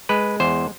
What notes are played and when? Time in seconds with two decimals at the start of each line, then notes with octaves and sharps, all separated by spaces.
0.09 G#3 B4
0.40 E2 C5